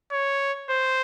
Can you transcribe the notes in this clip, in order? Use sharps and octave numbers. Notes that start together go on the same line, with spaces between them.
C#5
C5